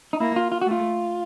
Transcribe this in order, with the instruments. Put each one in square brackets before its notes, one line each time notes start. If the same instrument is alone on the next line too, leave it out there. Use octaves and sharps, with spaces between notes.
[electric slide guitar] D#4
[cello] A#3 [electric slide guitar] E4
[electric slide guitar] F4
F4
F#4
[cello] A3 [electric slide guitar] F4